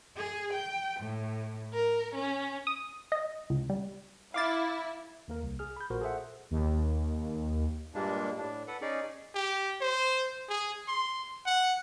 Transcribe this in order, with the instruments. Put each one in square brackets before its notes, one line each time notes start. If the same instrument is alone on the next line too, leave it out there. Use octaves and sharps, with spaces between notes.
[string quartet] G#4
G5
A2
A#4
C#4
[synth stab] D#6
D#5
C#2
G3
[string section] E4 [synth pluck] F5 D6 A6
[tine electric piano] D#2 A#3 A#4
C2
G#4 F6
B5 G6
A#1 A#2 F#4 A#4 C5
G#4 A4 C5 E5 F#5
[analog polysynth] D#2
[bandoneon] G2 A#2 G3 G#3 A#3 D4
A2 D4
A4 B4 F#5
C#4 D#4 G#4 D5
[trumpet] G4
C5
G#4
C6
F#5